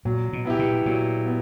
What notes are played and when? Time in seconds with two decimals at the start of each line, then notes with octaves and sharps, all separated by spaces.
0.05 A#2 F#3
0.33 B2
0.45 B3 E4 G4
0.59 A#2
0.86 A#2 F#3
1.26 B3